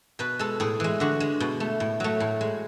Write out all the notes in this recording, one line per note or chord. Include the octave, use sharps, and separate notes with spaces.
B2 B4
G#3 A4
A2 G#4
E3 G#3
D3 F#4
G#3
B2
A3
A2
F#3 A3
A2
G#3